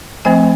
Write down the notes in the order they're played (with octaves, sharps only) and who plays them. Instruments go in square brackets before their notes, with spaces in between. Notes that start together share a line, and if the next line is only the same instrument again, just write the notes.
[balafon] F3 A3 C4 G#5